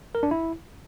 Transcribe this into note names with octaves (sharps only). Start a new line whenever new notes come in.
A#4
D4
E4